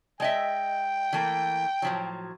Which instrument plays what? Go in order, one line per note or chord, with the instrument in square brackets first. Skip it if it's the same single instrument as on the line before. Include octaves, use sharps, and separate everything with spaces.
[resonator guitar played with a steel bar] G#3 D#5 E5 [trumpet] G5
[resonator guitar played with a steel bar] E3 A3 A#3
A2 F3 F#3